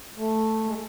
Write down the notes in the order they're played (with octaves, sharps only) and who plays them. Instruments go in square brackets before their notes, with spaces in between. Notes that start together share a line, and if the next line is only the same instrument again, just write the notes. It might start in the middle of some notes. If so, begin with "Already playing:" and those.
[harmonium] A3
G#3